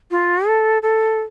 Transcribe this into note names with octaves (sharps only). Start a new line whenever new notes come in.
F4
A4
A4